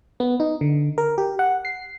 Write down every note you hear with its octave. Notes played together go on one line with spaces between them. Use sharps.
B3
D#4
D3
A#4
G4
F#5
C7